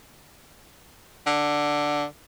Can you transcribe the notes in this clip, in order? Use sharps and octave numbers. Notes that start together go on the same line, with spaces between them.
D3